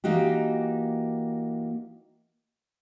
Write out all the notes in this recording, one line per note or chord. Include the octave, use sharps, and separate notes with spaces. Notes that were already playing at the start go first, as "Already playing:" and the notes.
E3 A#3 D#4 F#4 G4